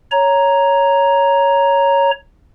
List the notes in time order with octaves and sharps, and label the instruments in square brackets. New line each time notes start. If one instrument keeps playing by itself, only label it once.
[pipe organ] C#5 A#5